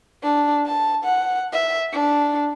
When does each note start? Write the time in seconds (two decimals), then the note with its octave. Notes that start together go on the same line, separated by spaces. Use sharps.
0.23 D4
0.66 A5
1.04 F#5
1.53 E5
1.93 D4